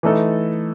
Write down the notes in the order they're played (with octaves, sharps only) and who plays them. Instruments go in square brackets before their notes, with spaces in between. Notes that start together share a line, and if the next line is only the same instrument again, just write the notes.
[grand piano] E3 A3 D#4 A4